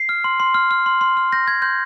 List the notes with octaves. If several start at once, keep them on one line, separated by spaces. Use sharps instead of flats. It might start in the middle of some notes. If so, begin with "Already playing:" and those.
Already playing: C7
F6
C6
C6
F6
F6
C6
C6
F6
G6 A#6
C6 G#6
C6 G6